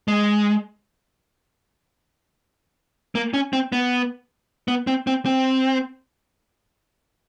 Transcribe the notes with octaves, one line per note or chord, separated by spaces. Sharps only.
G#3
A#3
C#4
C4
B3
B3
C4
C4
C4